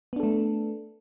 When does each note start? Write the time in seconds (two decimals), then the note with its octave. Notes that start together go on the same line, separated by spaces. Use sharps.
0.13 B3
0.16 D4
0.20 A4
0.23 A3